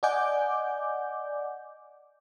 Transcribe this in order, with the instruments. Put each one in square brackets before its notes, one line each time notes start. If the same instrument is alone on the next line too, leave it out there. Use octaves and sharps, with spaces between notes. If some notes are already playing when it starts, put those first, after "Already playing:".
[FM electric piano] D5 D#5 F#5 G#5 D6 G6